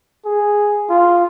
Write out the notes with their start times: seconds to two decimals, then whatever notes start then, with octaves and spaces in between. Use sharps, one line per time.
0.26 G#4
0.89 F4